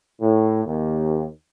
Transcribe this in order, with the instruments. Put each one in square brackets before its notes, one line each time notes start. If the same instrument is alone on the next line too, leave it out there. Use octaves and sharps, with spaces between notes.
[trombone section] A2
D#2